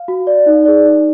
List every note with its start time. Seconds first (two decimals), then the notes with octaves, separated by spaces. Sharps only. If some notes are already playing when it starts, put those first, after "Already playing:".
Already playing: F5
0.08 F#4
0.27 D5
0.46 D#4
0.65 G#4 D5
0.85 D#4